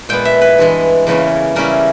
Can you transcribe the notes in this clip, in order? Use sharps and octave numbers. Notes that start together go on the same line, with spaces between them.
A#2 G#3 B3 G5
E5
B4
G2 E3 G#3
E2 C#3 E3 A#3 C#4
C#3 G3 C#4 E4 A#4